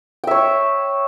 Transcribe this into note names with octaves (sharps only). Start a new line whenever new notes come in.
C#5 E5 G5